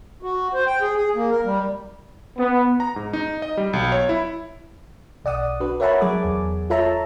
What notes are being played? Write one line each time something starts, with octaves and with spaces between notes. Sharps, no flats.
F#4
C5
G5
G#4
G#4
A#3
A#4
G3
B3
A#5
G#2
D#4
D#5
G3
B1
C#5
E4
B1 D5 F#5 D#6
D4 F#4 A4 B4
A#4 C#5 E5 F#5 A5 B5
F#3 G#4 G#5 D6
E2
F4 A4 C#5 E5 A5 A#5